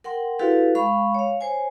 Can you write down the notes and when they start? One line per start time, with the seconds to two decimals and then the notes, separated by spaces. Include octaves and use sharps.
0.04 A#4 F#5 G5 C6
0.39 E4 F#4 G4 A4 B4 F5
0.75 G#3 F5 B5 C#6
1.15 C#5 F5
1.41 C5 C#5 G#5